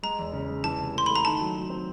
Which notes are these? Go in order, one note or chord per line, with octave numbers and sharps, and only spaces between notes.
G#3 A#5
E2
C#3
G#3
E3 A5
C3
A3 C6
A3 B5
A#5
D#3 A5
F#3
F#3
C4